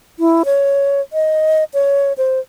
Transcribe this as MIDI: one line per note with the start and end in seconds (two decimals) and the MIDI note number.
0.19 0.43 64
0.45 1.01 73
1.13 1.64 75
1.74 2.13 73
2.18 2.40 72